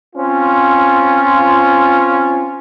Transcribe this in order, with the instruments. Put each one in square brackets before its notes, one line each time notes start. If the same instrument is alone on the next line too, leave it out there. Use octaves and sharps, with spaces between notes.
[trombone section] C4 C#4 F4